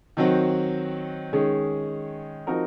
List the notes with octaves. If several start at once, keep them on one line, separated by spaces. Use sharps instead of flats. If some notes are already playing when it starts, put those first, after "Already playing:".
D#3 F#3 C4 F#4
D#3 G#3 C#4 G#4
F3 C4 D#4 F#4 A#4